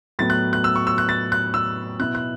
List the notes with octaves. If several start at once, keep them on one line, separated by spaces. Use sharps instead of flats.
A2 F#3 B3 A6
F#6
F#6
E6
C#6
E6
F#6
A6
F#6
E6
B2 B3 E4 F#6
F#6